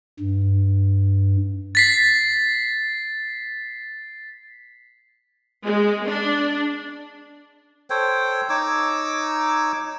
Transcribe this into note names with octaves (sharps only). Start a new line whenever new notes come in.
G2
A6 B6 C7
G#3
D4
A4 C5 C#5 G5
D#4 C#5 D6 E6